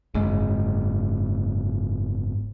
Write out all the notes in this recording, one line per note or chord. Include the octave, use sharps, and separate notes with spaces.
F#1 G#2